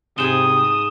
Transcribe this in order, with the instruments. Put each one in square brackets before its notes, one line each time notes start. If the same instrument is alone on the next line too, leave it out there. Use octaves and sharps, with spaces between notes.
[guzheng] G#2 G5 G#5 [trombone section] C3 [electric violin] D#6 [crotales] E7 G7